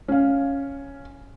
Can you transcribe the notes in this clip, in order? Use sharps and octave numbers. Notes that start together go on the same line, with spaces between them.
C#4 F5